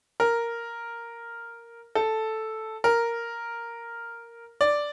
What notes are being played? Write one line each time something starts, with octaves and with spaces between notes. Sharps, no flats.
A#4
A4
A#4
D5